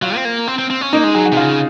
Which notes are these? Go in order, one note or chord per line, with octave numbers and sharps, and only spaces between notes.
F#3 F4
C4
A#3
C4
C4
C4
C#4
A#3 D#4
G#3
F#3 G#4
F#4
C3
C#3 F4